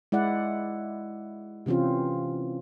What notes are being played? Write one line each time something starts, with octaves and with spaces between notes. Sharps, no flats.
G#3 E4 D5 F#5
C3 E3 C4 C#4 F4